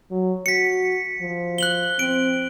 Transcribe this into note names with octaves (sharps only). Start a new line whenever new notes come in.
F#3
F#4 B6 C#7
F3
F#6 F#7 G7
C4 D7